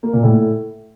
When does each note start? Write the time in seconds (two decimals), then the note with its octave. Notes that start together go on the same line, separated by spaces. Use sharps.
0.03 A#3
0.13 A#2
0.23 A2